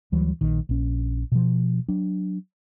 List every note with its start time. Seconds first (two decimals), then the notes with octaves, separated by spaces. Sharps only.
0.12 D2 E3 F#3 G3
0.41 A#1 D#3
0.69 A#1 C#4
1.32 B2 F3
1.88 F#3 D4